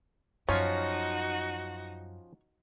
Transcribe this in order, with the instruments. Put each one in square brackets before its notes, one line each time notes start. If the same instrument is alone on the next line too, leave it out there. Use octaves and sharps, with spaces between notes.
[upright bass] F#2 [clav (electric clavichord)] F3 C#4 F4 [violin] D#4 F#4 [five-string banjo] C#5